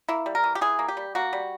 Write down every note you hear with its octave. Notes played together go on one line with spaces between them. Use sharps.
A#3 E4
G3
A#4
E3
G4
E3 G#4
A#3
G4
G3
A#3 F#4
G3